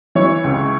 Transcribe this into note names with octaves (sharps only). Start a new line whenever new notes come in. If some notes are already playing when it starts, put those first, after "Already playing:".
E3 C#5
C#2